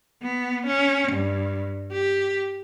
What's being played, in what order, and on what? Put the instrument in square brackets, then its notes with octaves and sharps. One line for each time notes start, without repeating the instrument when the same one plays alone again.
[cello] B3
C#4
G2
G4